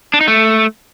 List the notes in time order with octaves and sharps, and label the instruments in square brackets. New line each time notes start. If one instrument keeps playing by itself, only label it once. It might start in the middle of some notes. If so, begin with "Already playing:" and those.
[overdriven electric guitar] D4
D#4
A3